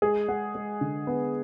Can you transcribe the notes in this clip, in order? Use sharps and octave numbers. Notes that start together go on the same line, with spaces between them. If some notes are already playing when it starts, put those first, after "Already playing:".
G#3 G#4
G#3 F#5
G#3
D3
B3